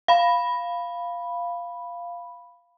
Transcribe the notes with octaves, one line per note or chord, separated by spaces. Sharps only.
F5 B5